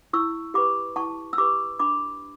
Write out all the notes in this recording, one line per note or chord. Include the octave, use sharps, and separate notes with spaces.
E4 C#6 E6
G4 B4 B5 D6
E4 A5 C#6
E6
G4 B4 B5 D6
D4 B5 D6